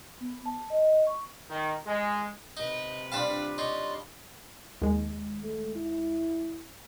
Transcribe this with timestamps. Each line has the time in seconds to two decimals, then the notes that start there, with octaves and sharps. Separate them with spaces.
0.21 B3
0.46 A5
0.70 D#5
1.07 C#6
1.49 D#3
1.85 G#3
2.57 C3 D#4 B4
3.12 G3 D4 F4 F5 A5 B5
3.58 D#4 C#5 D5 C6
4.82 D#2 G#3
5.42 A3
5.76 E4